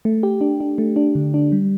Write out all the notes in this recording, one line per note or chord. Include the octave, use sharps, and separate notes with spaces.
A3
G4
D4
D4
A3
D4
D3
D4
G3